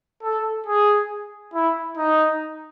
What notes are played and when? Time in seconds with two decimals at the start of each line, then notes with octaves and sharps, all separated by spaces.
0.23 A4
0.66 G#4
1.54 E4
1.97 D#4